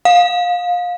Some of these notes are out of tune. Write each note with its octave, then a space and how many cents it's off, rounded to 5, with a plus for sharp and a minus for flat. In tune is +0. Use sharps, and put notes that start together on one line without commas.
F5 +25